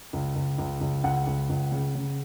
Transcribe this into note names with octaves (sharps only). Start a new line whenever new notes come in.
C#2
C#2
C#2
C#2
C#2 F#5
C#2
C#2
C#3
C#3